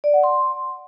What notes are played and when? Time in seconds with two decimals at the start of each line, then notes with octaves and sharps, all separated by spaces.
0.04 D5
0.14 F#5
0.24 C6